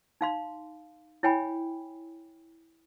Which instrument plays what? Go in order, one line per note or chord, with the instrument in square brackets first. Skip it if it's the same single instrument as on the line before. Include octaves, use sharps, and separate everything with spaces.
[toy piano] D#4 F5 C6
E4 C#5 G5 G#5 B5